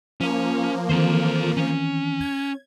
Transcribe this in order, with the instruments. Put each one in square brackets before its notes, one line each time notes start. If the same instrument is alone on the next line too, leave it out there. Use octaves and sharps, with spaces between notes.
[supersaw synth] F3 A#3 [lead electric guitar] C#4
[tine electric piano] D#3 E3 C4 [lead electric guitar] A4 C5
[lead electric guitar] C#4
[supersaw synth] G#6